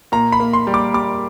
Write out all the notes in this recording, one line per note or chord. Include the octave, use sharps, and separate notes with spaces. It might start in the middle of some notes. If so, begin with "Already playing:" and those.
A#2 A#5
B5
A#3
C6
G3
D6
G3 D6